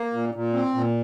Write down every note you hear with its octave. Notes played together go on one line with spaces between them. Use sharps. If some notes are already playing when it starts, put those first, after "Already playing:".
Already playing: A#3
A#2
A#2
C4
A#2